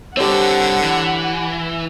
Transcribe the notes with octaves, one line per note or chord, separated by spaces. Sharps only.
D3 G3 C4 G4 C#5 F#5
E3